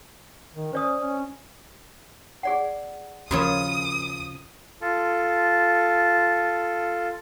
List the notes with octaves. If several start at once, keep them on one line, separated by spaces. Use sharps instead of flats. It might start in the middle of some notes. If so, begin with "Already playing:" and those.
D#3
C#4 C5 D5 D#6
C#4
G#4 D5 F#5
D#2 C#3 F3 F#4 A4 A#4 C#5 D#6
F4 A4